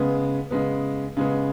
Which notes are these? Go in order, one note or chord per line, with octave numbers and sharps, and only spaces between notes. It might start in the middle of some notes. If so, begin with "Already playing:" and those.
Already playing: C#3 G#3 B3
C#3 G#3 B3
C#3 G#3 B3